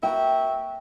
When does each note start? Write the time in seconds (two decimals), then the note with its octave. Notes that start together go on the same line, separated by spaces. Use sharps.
0.03 A#3 F#4 E5 G5